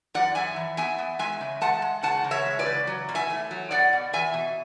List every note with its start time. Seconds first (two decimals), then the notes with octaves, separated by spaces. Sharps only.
0.14 F#2 D5 F#5
0.35 F#2 E5 G#5
0.56 E3
0.77 B3 E5 G#5
0.99 B3
1.19 G#3 E5 G#5
1.41 C#3
1.61 G#3 F#5 A5
1.82 G#3
2.03 C#3 F#5 A5
2.24 C#3
2.31 C#5 E5
2.46 G#3
2.59 B4 D5
2.66 C#3
2.87 F#3
3.09 B2
3.15 E5 G#5
3.30 A3
3.51 F#3
3.71 B2 D5 F#5
3.93 B2
4.13 E2 E5 G#5
4.34 B2